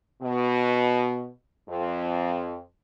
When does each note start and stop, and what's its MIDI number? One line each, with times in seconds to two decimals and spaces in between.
0.22 1.29 47
1.69 2.59 41